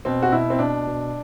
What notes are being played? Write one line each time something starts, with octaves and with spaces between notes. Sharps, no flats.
B2 C4
F#4
B2 E4
C4
B2 D4
B2